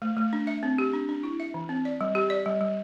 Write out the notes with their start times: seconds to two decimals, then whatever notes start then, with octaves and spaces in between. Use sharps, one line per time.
0.02 A3
0.17 A3
0.33 D4
0.47 E5
0.63 C4
0.78 G4
0.93 D4
1.09 D4
1.23 E4
1.40 E5
1.54 E3
1.69 C4
1.85 D5
2.01 G3
2.15 G4
2.30 D5
2.46 G3
2.61 G3